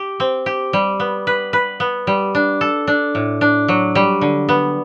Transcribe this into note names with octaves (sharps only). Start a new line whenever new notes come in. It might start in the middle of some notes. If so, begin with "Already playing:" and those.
Already playing: G4
C4
G4
G3
B3
B4
B4
B3
G3
D4
A4
D4
A2
D4
F#3
G3
D3
B3